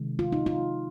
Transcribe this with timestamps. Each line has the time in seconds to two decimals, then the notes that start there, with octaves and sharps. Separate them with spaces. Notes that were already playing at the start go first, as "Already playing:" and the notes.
Already playing: C3 D#3 G#3
0.19 F4
0.32 D#4
0.46 F4